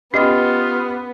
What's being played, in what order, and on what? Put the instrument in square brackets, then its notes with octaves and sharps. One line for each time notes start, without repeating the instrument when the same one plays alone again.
[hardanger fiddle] B3 [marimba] C#4 [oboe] F4 [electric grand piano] G4 D#5